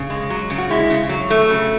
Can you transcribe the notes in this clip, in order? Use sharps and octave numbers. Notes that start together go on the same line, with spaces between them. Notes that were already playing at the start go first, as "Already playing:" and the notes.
Already playing: C#3
G#3
F#3
C#3
F#4
G#3 E4
C#3
F#3
A3
C#3